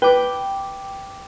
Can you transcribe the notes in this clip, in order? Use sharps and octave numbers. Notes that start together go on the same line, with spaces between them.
B4 G5 D6